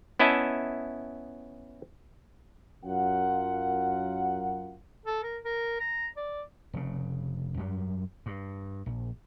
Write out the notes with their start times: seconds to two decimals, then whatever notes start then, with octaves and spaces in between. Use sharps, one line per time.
0.19 B3 C#4 E4 D#5 E5 A5
2.84 F#2 F4 A#4 F#5
5.06 A4
5.23 A#4
5.44 A#4
5.80 A#5
6.17 D5
6.73 F1 C#3
7.57 F#2 F#3 G3
8.26 G2
8.86 A#1